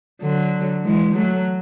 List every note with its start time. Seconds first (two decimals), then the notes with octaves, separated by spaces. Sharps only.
0.21 D3 F#3
0.84 E3 G#3
1.15 F#3 A3